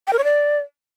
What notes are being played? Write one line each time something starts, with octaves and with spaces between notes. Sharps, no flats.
G5
A#4
C#5
D5